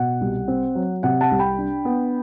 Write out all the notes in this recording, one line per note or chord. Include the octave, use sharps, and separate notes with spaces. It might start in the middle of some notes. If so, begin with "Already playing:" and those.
Already playing: B2 F#5
C2
C4
F#3
C3 F#5
F#5 A5
C2
G5 B5
D4
B3